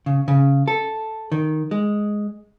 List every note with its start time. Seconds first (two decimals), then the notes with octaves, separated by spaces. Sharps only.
0.06 C#3
0.28 C#3
0.68 A4
1.32 D#3
1.71 G#3